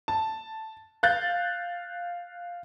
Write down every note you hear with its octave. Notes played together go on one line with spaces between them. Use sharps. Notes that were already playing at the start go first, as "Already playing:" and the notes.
A5
F5 F#6 G6 A6